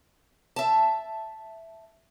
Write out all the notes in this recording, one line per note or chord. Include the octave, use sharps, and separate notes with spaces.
E5 A5